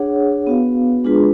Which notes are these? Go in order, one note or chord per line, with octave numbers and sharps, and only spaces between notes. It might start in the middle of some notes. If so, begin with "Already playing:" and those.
Already playing: D4 G#4 C#5 F#5
B3 F#4 B4 F5
G#3 D4 F4 G#4 B4